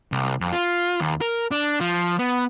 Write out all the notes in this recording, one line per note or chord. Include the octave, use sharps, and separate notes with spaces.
C2
F2
F4
D#2
A#4
D4
F3
B3